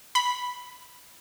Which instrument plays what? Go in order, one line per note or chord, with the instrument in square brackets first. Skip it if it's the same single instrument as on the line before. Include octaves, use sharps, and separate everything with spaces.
[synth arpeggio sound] B5